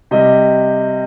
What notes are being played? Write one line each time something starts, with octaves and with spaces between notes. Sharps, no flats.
C3 G3 D#5